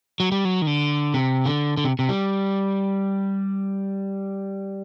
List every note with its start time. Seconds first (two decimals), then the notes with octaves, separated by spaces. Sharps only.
0.20 F#3
0.32 G3
0.45 F#3
0.62 D#3
0.67 D3
1.14 C3
1.46 D3
1.77 D3
1.84 C3
1.99 C3
2.09 G3